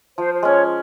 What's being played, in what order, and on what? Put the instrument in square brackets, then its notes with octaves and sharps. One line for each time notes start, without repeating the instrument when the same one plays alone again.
[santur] F3 [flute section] C5
[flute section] C5
[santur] G#3 C#4 [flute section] C#5